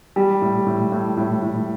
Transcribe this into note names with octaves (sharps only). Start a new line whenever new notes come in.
G3
A2
A2
A2
A2
A2